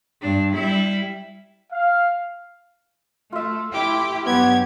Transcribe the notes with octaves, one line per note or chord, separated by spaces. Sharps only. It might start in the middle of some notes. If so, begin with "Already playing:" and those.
G2 D4
G3 E4
F5
A3 F4 E5
A3 E4 G4 G5 D6
G2 F#3 B3 G4 G#6